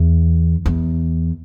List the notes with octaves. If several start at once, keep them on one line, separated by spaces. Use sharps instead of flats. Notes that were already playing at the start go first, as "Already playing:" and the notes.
Already playing: E2
E2